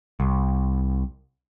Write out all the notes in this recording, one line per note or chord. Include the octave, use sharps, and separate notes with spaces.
C2